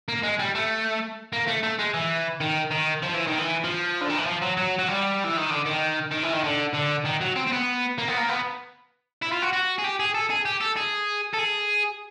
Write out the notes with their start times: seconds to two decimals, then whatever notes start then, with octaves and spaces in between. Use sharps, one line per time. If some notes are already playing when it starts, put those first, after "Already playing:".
0.08 A#3
0.23 G#3
0.39 G3
0.55 A3
1.33 A#3
1.47 A3
1.63 A3
1.79 G#3
1.94 E3
2.41 D#3
2.71 D#3
3.03 F3
3.14 E3
3.27 D#3
3.39 E3
3.64 F3
4.01 D3
4.10 D#3
4.18 E3
4.26 F3
4.42 F#3
4.57 F#3
4.78 F#3
4.88 G3
5.24 E3
5.37 D#3
5.50 D3
5.66 D#3
6.12 D#3
6.23 E3
6.33 D#3
6.44 D3
6.74 D3
7.05 D#3
7.21 F#3
7.36 C4
7.47 C4
7.52 B3
7.98 A#3
8.08 B3
8.17 A#3
8.29 B3
9.22 E4
9.32 F4
9.42 F#4
9.53 F#4
9.79 G#4
9.84 G4
10.00 G#4
10.15 A4
10.30 G#4
10.45 G4
10.61 A4
10.77 G#4
11.34 A4
11.39 G#4